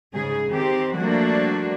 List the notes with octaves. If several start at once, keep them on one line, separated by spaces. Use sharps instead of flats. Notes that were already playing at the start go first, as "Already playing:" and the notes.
G#2 C#3 G#4
D#3 C4 G4
F3 G3 A3 A#3 D4 F#4